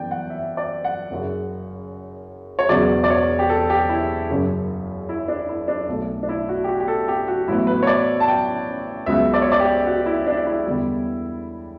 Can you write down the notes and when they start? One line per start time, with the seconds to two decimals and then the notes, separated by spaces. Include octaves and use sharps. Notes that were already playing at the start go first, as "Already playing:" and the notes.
Already playing: F#2 E3 G3 B3 D5 G5
0.11 F#5
0.30 E5
0.57 D5
0.84 F#5
1.11 F#1 F#2 C#3
2.59 C#5
2.69 E1 E2 C#3 F#3 D5
3.04 D5
3.10 C#5
3.39 G4
3.49 A4
3.70 G4
3.89 E4
4.29 F#1 F#2 C#3
5.09 E4
5.28 D4
5.49 E4
5.68 D4
5.89 B1 B2 A3
6.23 D4
6.29 E4
6.49 F#4
6.64 G4
6.68 F#4
6.80 G4
6.88 A4
7.08 G4
7.28 F#4
7.48 A1 A2 F#3 B3 E4
7.67 B4
7.83 C#5
7.87 D5
8.20 A5
8.28 G5
9.06 C#2 C#3 F#3 B3 E5
9.34 D5
9.42 C#5
9.52 D5
9.60 G4
9.86 F#4
10.06 E4
10.27 D4
10.47 E4
10.67 E2 D3 G3 B3